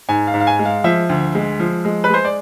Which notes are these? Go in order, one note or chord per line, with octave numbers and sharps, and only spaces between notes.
G#2 G#5
F5
G#2
F5
G#5
G#3
F5
F3 E5
D2
G#3
F3
G#3
B4
G#3 C5
D5